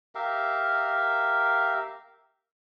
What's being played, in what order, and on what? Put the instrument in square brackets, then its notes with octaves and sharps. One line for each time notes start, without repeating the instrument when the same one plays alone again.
[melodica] G4 A#4 E5 F5